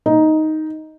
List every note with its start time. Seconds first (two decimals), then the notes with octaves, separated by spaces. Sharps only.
0.06 D#4